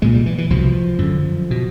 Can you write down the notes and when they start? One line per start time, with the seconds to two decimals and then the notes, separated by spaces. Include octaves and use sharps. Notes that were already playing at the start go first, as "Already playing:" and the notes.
0.02 C2 A#2 G#3
0.14 G3
0.26 E3
0.38 E3
0.50 C2 B2 F3
0.99 F#2 D3
1.51 B2